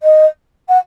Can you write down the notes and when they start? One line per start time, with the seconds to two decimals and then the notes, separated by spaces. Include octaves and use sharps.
0.03 D#5
0.68 F#5